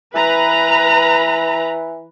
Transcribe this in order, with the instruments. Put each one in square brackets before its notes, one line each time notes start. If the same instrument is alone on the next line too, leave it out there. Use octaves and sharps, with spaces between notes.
[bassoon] E3 [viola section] B4 A#5